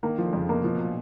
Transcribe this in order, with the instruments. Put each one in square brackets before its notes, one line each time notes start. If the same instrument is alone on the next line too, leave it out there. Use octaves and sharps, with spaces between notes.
[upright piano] D#3 [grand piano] A#3
[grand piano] F3
[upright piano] D3
[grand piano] F2 [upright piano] C#3
[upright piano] B2 [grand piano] A#3
[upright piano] B2 [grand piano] F3
[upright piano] B2
A#2